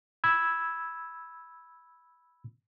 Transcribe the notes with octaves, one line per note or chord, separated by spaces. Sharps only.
B5 E6 G#6